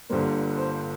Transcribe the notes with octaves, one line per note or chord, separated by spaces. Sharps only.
G1 G2 D3 G3 A#3 C5
C5